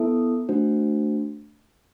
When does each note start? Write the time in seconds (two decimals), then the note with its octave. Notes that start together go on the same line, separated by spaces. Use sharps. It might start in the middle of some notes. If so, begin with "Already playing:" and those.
Already playing: B3 E4 A4 E5
0.49 A3 D4 F#4 C5